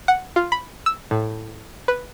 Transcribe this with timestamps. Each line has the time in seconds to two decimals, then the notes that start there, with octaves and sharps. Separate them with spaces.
0.08 F#5
0.36 F4
0.52 B5
0.86 E6
1.11 A2
1.88 B4